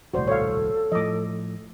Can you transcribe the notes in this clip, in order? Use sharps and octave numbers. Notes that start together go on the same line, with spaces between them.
D#1 C2 A2 F#4 C5 D5
A4 C#5 F5
A2 F3 D#5 D6